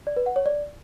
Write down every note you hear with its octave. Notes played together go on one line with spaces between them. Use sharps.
D5
B4
F#5
C#5
D5